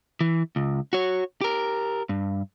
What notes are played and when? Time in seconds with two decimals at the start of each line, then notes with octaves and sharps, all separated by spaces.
0.21 E3
0.56 C#2
0.93 F#4 C#5
1.41 G4 A#4
2.09 G2